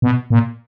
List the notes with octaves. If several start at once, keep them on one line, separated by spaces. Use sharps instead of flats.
B2
A#2